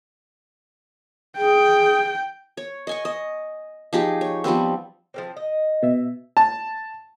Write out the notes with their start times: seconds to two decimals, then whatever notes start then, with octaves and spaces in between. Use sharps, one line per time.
1.38 G#4 G5
2.57 C#5
2.87 D#5 G#5 C#6
3.05 D#5
3.93 F3 D#4 G4 G#4
4.21 C#5
4.44 F3 G3 B3 C4
5.14 F3 A#3 C4
5.36 D#5
5.83 B2 E5
6.37 A5